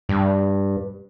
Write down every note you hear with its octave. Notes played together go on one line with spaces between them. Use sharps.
G2